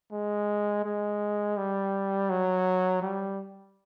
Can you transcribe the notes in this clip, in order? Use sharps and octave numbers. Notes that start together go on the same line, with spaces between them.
G#3
G#3
G3
F#3
G3